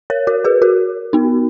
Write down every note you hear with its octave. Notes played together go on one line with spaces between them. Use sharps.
A#4 C#5
F#4 A#4
G#4 B4
F#4 A#4
B3 D#4